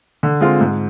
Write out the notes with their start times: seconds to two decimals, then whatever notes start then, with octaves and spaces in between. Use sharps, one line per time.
0.23 D3
0.41 G#3 C4 F4
0.61 G#2